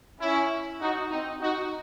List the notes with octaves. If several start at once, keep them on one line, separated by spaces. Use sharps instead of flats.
C#4 E4
D#4 F#4
C4 D#4
D#4 F#4